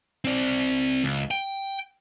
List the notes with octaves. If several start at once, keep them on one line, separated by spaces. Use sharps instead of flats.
C4 D5
C#2
G5